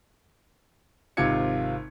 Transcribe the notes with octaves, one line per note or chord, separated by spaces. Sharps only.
G#1 C3 F4 G#6 C#7